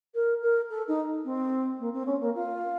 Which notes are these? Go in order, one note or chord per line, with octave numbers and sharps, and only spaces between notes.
A#4
A#4
A4
D#4
C4
A#3
C4
C#4
A#3
F4